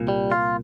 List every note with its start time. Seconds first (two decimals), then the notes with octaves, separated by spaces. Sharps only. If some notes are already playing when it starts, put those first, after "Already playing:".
Already playing: C2 A#2
0.08 G3
0.32 F4